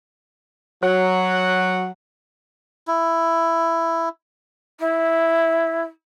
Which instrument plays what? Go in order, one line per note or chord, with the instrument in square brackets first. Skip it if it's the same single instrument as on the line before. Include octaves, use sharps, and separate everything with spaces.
[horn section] F#3 F#5
[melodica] E4
[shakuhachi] E4